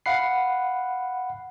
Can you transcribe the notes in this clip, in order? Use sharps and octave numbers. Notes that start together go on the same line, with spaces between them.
F5 F#5 B5 C7